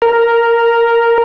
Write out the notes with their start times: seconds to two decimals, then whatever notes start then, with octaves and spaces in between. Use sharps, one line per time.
0.02 A#4